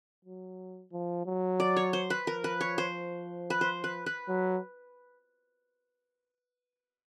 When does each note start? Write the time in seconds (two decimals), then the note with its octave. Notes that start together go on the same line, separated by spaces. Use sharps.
0.25 F#3
0.92 F3
1.26 F#3
1.60 D5
1.77 C#5
1.93 C5
2.10 B4
2.27 F3 A#4
2.44 B4
2.61 C#5
2.78 C5
3.50 B4
3.61 C5
3.84 B4
4.06 B4
4.29 F#3